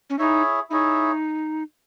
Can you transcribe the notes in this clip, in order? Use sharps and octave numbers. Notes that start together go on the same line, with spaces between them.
C#4
D#4 E4 G#4 C#5 E5
D#4 E4 G#4 C#5 E5